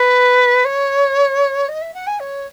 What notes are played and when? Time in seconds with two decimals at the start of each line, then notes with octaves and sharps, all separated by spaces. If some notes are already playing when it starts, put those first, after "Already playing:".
Already playing: B4
0.65 C#5
1.68 D#5
1.81 E5
1.94 F#5
2.06 G#5
2.19 C#5